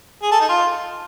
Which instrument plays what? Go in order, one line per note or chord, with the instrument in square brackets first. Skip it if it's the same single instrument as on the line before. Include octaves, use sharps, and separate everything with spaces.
[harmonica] G#4
A4
D#4
F4